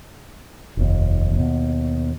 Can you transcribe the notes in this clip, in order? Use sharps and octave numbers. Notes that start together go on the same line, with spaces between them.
F1 D#2
D#2 B2